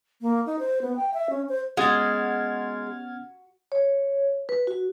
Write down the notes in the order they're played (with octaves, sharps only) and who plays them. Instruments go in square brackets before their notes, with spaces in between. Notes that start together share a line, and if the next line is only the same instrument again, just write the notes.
[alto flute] A#3
D#4
C5
B3
G5
E5
C#4
C5
[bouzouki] G#3 [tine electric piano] B3 C#4 [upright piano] F#4 [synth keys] F6 G#6 A6
[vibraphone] C#5
B4
F#4